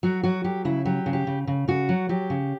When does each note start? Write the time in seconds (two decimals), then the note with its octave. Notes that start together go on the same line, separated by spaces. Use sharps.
0.03 F#3 F#4
0.23 F#3 F#4
0.44 F#3 G4
0.65 C#3 E4
0.85 F#3 G4
1.06 C#3
1.13 G4
1.27 C#3
1.47 C#3
1.68 C#3 F#4
1.89 F#3
2.09 F#3 G4
2.30 C#3